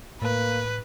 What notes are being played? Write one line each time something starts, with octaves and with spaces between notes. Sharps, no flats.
A2 A#3 B4